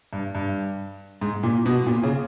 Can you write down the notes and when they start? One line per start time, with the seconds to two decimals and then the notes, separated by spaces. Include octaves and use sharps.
0.13 G2
0.35 G2
1.21 G#2
1.43 A#2
1.66 B2
1.86 A#2
2.03 C#3